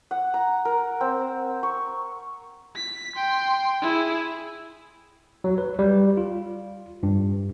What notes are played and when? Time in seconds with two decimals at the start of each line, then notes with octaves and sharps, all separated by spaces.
0.11 F#5
0.34 A#5
0.65 A#4
1.01 C4
1.63 C#6
2.76 B6
3.16 G5 C6
3.82 E4 G#4
5.44 F#3
5.58 B4
5.79 G3
6.17 F4
7.03 G2